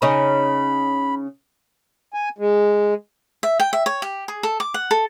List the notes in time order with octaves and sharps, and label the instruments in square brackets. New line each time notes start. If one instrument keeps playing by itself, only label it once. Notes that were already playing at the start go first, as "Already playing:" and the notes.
[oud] C#3 C#4 D#4 [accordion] B5
[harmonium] G#5
G#3
[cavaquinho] E5
G5
E5
C#5
G4
G#4
A4
D6
F#5
A4